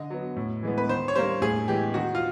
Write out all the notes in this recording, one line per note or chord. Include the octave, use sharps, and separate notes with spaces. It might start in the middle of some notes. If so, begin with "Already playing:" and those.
Already playing: D3 D#5
F#3 B3
A2
E3 G#3 B3
B4
D#3 C5
C#5
G3 A#3 C5
A2 G#4
E3 G#3 B3 G4
D#3 F#4
F4